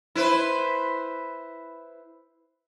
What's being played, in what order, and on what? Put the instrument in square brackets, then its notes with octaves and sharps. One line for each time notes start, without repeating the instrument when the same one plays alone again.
[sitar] E4 B4 C5